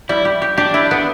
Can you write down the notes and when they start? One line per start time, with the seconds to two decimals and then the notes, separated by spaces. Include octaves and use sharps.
0.09 G3 E4
0.25 G4
0.42 G4
0.57 D4 G4
0.74 E4
0.91 B3